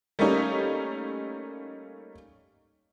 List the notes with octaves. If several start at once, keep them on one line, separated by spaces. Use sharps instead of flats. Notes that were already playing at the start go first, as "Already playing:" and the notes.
G3 A3 A#3 C#4 D#4